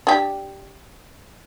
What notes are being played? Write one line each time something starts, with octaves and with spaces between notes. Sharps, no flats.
D4 G4